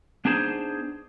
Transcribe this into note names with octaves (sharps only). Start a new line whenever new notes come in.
B3 D4 D#4 G#4 C5 A5